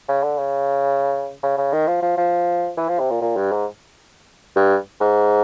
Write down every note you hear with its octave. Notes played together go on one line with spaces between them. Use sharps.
C#3
D3
C#3
C#3
C#3
D#3
F3
F3
F3
E3
F3
C3
A#2
A#2
G2
G#2
G2
G#2